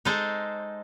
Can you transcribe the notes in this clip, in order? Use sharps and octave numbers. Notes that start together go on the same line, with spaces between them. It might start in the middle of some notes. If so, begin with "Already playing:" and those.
G#3 D#4 A4 C5